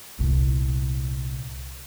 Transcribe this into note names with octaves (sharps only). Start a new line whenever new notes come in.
C2 A#2